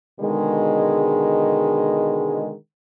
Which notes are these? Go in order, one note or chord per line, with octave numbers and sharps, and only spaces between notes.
B2 D3 D#3 G#3